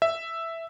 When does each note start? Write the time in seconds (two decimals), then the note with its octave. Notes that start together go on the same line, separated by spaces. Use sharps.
0.02 E5